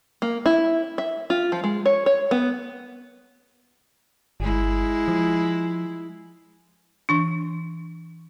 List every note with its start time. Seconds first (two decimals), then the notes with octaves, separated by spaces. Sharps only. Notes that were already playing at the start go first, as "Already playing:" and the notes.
0.22 A#3
0.46 E4
0.98 E5
1.30 F4
1.52 F3
1.64 G#3
1.86 C#5
2.06 C#5
2.31 B3
4.40 G1 G#3 E4
5.08 F3
7.09 E3 D4